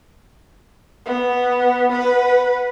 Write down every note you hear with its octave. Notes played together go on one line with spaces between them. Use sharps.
B3
B4 F#5